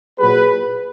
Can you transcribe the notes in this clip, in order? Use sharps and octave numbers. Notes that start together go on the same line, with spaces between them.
A#2 F#3 G#4 B4